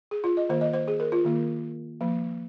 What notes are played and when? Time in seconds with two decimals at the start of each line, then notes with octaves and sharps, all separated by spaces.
0.11 G#4
0.24 F4
0.37 D#5
0.49 D#3 A#3 C5
0.61 D#5
0.73 C5
0.88 G#4
1.00 A#4
1.12 F4
1.24 D#3 A#3
2.01 F3 A#3